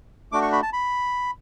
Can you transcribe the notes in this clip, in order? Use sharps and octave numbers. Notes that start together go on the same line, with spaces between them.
A3 D4 F#4 D6
C#6
B5
A5
B5